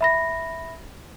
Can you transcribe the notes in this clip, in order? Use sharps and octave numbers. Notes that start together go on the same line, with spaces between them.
E5 B5 A#6